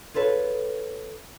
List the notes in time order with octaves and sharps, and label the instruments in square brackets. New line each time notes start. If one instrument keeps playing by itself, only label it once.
[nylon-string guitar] F4 G#4 A4 B4 C#5